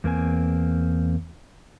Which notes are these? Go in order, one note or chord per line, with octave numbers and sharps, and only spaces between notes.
E2 A#3 C4 G#5